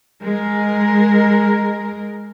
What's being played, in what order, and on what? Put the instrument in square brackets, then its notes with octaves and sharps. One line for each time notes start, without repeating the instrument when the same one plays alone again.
[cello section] G#3 A#4